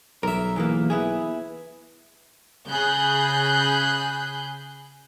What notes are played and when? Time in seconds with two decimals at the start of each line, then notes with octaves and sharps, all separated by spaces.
0.23 B1 A#4 E5
0.56 E2 E3 A#3
0.90 B3 E4 G#4
2.69 C#3 G#4 B5 F#6 G6